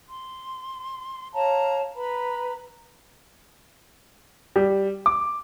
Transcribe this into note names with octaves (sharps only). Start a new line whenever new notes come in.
C6
C#5 F5 A5 A#5
B4 A#5 B5
G3
D6